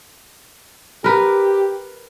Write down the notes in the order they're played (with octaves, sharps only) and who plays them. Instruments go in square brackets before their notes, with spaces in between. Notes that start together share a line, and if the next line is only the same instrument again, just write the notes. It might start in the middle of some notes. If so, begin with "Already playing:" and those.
[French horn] G4 [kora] A#4 B4